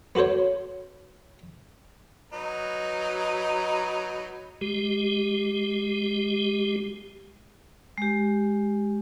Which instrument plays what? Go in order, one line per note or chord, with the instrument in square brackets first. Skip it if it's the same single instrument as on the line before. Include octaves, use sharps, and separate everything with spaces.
[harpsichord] B3 F#4 A4 C5 C#5
[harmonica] F#3 D#4 B4
[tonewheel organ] G#3 G4
[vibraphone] G#3 G4